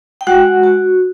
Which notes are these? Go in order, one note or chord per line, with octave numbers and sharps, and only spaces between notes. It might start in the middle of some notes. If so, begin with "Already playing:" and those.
G5
G#3 F#4 F#5
F#4